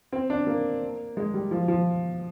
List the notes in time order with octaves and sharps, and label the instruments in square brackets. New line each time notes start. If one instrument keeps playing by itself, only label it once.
[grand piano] C4
D4
A#3
G#3
G3
F3
F3